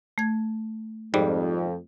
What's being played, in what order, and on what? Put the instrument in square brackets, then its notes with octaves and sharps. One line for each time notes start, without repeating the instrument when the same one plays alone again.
[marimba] A3 G#6
[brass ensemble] F2 [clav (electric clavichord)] G#2 G3